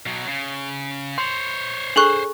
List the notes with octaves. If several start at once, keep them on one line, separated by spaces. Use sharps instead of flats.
B2 F#3
C#3
C5 C#5 C6
D4 G#4 A4 C#6 F#6